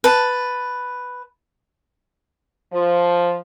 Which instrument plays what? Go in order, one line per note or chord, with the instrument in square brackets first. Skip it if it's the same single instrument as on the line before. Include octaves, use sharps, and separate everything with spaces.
[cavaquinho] B4 A5
[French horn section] F3